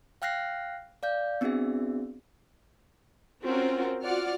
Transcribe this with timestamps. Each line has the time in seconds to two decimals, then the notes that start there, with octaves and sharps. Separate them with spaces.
0.22 F5 G5 F6 F#6 A#6 C7
1.03 D5 F5 G6
1.41 B3 C4 D4 F#4 G#4 E5
3.43 C4 C#4 F4 F#4 A#4
4.04 F4 F#4 D5 F#5 F6